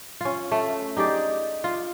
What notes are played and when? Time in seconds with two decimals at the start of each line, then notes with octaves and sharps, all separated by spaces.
0.21 C#4 F4
0.52 A3
0.97 D#4 G4 G#4 D5
1.64 F4